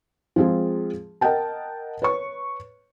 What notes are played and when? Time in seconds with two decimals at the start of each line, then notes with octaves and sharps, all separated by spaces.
0.36 F3 G#3 C4 F4 G#4
1.21 A#4 D#5 F#5 G5 A5
2.02 B4 C#5 C#6